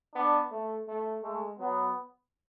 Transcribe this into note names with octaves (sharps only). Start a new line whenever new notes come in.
B3 D4
A3
A3
G#3 A3
F#3 B3